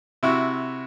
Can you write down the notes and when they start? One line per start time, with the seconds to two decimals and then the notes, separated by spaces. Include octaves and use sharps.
0.23 C3 E4 F#4